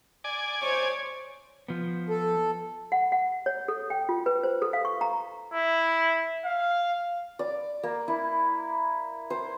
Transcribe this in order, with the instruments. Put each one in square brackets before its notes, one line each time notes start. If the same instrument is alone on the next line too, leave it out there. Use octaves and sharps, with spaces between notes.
[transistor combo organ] D5 G#5
[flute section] C5 [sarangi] C#5
[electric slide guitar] F3 B3
[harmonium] A4
[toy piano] F#5
F#5
C#5
A4
G5
F4
B4
C5
A4
F5
C#6
A#5
[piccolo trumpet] E4
F5
[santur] D5
A#3
E4
C5